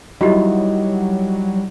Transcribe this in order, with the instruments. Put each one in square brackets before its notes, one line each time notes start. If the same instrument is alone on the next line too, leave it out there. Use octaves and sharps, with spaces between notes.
[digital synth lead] F#3 [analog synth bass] G3 [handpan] D#4 E4 [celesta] F#4 G4 D#5